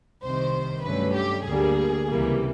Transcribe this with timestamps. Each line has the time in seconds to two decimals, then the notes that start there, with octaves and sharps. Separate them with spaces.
0.23 C2 C3 D#3 C5
0.84 G2 D3 F#3 A3 C#4 B4
1.14 G4
1.45 D2 D3 G3 A#3 G#4
2.06 C#2 C3 E3 G3 A#3